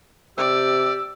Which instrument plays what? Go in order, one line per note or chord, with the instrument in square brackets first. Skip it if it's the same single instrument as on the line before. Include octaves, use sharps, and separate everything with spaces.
[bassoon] C3 [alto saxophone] G4 [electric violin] D5 [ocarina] E6